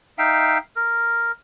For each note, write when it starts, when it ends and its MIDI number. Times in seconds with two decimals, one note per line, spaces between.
0.18 0.58 63
0.18 0.58 76
0.18 0.58 77
0.18 0.58 79
0.76 1.32 70